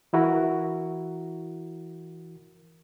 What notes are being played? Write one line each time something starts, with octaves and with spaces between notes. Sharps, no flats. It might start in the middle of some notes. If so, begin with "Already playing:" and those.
E3 E4 F#4 A#4